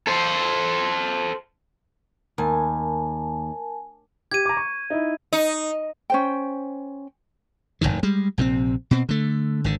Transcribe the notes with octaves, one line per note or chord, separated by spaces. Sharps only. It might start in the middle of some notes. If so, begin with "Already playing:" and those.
A4 C5
D#2 A#4 G#5 A5
G4 G#6 D#7
A#5 D6
C#6
D#4 E4
D#4
C#4 C5 G5
F1 B1 A2 D#3
G3 G#3
A#1 C3 F3 C4
B2 C4
D3 A3
G#1 D3